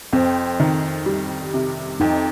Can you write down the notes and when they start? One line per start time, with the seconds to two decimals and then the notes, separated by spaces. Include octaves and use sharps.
0.13 F2 C4
0.60 D#3
1.06 G3
1.54 C3
2.00 F2 D#4